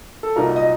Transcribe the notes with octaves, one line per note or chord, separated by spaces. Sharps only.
A4
C2 A#2 F#3 A#3 D#4 A#4
D#5